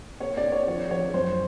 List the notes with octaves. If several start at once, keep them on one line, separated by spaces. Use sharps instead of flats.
A#3 C#5
D5
A#3
C#5
F3 C#5
F3 C#5
F#2 C5